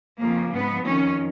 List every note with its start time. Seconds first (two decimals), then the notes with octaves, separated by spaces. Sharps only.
0.19 F2 C#3 F3 A#3
0.53 G#2 F3 B3
0.86 F2 D#3 C#4